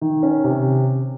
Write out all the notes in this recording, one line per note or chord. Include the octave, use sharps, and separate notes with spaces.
D#3
C#4
C3